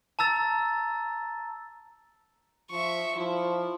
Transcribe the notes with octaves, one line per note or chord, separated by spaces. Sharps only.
A5 A#5 E6 A6
F3 E5 C#6
F3 E4